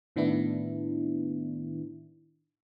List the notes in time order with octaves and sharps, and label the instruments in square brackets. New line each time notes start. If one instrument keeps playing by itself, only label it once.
[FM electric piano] A2 D#3 B3 D4 E4